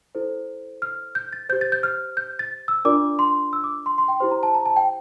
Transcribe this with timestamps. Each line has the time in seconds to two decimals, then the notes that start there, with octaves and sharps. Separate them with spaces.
0.15 E4 A4 C5
0.82 F6
1.15 G6
1.33 A6
1.49 G4 C5 G6
1.61 A6
1.72 G6
1.83 F6
2.17 G6
2.39 A6
2.68 E6
2.85 D4 F4 A#4 D5 D6
3.19 C6
3.53 E6
3.64 D6
3.86 C6
3.98 C6
4.08 G5
4.20 E4 G4 C5 C6
4.31 A#5
4.43 A5
4.54 A#5
4.66 A5
4.76 G5